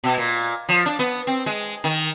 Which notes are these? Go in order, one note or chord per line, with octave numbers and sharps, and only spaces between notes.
B2
A#2
F3
D4
B3
C4
G#3
D#3